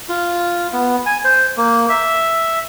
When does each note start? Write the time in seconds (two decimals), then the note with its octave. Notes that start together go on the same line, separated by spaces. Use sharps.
0.09 F4
0.73 B3
1.06 G#5
1.24 C5
1.57 A#3
1.89 E5